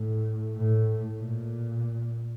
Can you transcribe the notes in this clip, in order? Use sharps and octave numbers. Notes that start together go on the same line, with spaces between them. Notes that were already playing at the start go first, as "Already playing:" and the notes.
Already playing: A2
A2
A#2